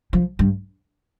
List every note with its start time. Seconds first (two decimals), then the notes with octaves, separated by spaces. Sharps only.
0.13 F3
0.39 G2